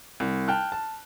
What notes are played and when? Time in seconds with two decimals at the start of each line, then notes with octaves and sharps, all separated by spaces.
0.20 C2
0.48 G5 A5 F6 F#6
0.72 A5